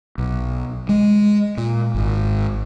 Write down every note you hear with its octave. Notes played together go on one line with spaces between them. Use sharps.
B1
G#3
A#2
G#1